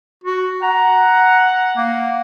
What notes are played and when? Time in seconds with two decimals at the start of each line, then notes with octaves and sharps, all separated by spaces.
0.24 F#4
0.63 F#5 A#5
1.77 A#3